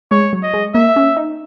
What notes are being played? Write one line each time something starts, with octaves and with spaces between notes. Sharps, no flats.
G#3 C#5
F#3
D#5
G#3
A#3 E5
C#4
D#4